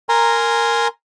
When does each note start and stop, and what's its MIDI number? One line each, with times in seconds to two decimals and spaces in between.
0.09 0.88 70
0.09 0.88 80
0.09 0.88 82
0.09 0.88 84